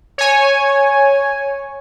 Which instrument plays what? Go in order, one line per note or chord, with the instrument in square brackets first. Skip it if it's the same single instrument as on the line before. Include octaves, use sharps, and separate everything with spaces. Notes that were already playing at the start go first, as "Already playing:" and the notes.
[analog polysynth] C#5 G#5